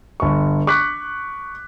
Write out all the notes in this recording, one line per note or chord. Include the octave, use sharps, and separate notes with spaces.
G1 C#6
C#6 D6 F#6 B6